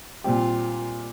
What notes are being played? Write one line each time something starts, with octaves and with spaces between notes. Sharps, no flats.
A#2 G3 C4 F4 G4